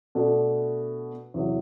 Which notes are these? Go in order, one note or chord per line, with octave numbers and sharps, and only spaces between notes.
B2 A3 D4
E2 C3 F#3